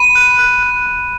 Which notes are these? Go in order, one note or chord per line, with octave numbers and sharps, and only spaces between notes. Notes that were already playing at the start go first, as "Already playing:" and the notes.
Already playing: B5 D#7
F#6
F#6
F#6
B5